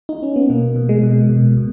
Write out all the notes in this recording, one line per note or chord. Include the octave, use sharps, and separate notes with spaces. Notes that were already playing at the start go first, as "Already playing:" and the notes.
D#4
C#4
B3
B2 A#3
B2
G#3
B2
B2
B2